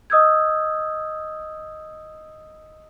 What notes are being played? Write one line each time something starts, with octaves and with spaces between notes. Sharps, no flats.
D#5 D#6 E6 G6 G#6